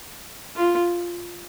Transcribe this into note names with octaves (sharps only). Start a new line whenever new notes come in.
F4